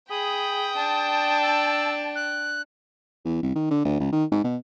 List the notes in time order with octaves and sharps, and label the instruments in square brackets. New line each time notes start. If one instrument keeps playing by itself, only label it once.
[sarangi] G#4 [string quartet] G5 [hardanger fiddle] B5 [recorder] D#6
[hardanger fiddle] D4 [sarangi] A5
[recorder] E6
F#6
[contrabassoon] E2
C2
D#3
D3
D2
C#2
D#3
G#2
B2